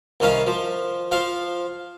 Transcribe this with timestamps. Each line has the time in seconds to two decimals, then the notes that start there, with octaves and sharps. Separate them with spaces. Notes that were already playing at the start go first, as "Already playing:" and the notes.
0.20 C2 D#3 C#4 F5
0.47 F3
1.12 F3 F5